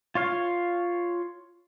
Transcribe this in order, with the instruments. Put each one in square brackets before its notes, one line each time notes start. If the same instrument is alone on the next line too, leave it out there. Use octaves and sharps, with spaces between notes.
[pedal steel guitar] F4 C#5 F5